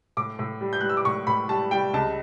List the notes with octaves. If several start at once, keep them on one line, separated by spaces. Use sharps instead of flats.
A2 D6
A2
G3
G6
G3 F#6
E6
D6
A2 C#6
A2 B5
G3 A5
G3 G5
C#2 A5